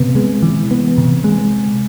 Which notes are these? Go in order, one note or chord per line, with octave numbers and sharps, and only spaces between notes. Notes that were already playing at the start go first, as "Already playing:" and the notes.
Already playing: C3 B3
G#3
E3
B3
C3
G#3